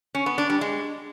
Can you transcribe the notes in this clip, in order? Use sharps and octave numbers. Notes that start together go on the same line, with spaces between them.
C#4
B3
D4
G3
G#3